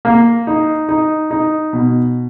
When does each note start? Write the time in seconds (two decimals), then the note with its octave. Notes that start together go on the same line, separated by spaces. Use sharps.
0.05 A#3
0.47 D#4
0.89 D#4
1.31 D#4
1.73 B2